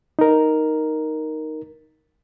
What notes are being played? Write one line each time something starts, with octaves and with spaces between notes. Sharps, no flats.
D#4 A#4